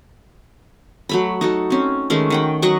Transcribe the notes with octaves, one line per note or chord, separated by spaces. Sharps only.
F#3 A3 B5
D#4 F#4 A4
C4 C#4
D#3 G#3 A3 C#4
D#3 F#5 G5
F#3 D#5 F#5 C#6